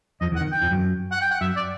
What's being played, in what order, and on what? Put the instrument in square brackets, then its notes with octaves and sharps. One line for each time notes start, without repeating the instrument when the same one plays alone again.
[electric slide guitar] F2 F3 [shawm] D#5
[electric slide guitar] E2 E3
[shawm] F#5
[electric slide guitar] D#3
[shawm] G5
[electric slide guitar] F2 F3
F#2 F#3
[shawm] F#5
G5
F#5
[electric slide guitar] F#2 F#3 [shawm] E5
[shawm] D5